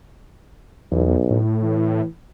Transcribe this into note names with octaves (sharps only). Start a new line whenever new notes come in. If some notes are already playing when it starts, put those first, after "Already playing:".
B1 E2
A2
E3